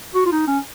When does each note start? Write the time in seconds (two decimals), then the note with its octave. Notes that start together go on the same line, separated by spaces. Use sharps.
0.15 F#4
0.26 F4
0.32 D#4
0.47 C#4